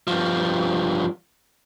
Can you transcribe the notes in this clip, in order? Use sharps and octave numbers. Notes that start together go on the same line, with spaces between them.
G2 F3